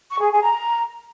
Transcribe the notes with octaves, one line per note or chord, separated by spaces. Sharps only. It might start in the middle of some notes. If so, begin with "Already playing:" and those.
C#6
G#4
G#4
A#5